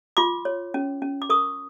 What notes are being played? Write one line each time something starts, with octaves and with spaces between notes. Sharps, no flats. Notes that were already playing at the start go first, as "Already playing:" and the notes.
F4 C6 D6
C#5
C#4
C#4
D6
A#4 C#6 D#6